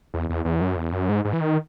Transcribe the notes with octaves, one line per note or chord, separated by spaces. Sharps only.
E2
E2
E2
F#2
E2
F#2
G#2
G#2
E3
D#3